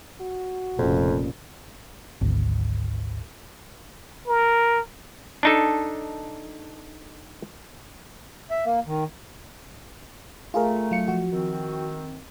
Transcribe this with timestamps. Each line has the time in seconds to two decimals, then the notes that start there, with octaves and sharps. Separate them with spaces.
0.21 F#4
0.78 F1 F2 A#2 C#3
2.21 G#1 D2
4.27 A#4
5.43 D4 D#4 A4
8.51 E5
8.65 A#3
8.86 D#3
10.54 A3 F4 G#4 A#4
10.91 F#3 F4 C#7
11.08 F3 F#4
11.31 D#3 C4